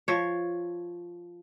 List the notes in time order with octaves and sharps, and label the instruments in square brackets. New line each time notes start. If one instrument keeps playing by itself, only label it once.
[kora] F3 C#5